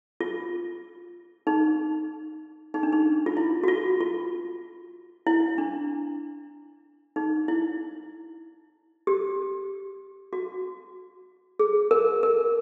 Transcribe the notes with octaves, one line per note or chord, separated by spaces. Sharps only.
F4
D#4
D#4
D4
D#4
F4
E4
F#4
F4
F4
E4
D4
D#4
E4
G4
F#4
G#4
A#4
A#4